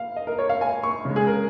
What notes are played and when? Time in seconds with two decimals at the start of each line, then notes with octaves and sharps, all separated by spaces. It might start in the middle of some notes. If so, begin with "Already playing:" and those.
Already playing: F5
0.16 D#5
0.27 A#4
0.39 C#5
0.49 F5
0.61 G#5
0.83 C#6
1.05 C#3 G#3
1.16 G#4
1.27 A#4